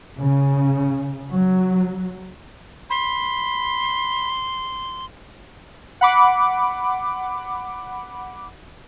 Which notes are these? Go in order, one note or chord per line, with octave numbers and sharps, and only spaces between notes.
C#3
F#3
B5 C6
F#5 B5 D6